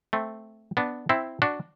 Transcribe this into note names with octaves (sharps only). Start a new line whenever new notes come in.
A3 C4
B3 D4
C4 E4
D4 F#4